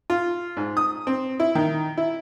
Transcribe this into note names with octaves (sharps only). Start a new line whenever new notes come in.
F4
G#2
D#6
C4
E4
D#3
E4